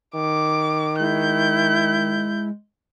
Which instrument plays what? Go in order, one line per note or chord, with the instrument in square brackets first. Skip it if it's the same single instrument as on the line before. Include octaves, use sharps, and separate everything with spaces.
[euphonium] D#3 [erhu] D6
[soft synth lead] G#3 [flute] E4 [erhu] G6